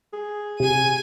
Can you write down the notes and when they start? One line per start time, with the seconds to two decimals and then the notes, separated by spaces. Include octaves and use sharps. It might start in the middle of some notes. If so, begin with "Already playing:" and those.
0.13 G#4
0.60 C3 G#5 D#7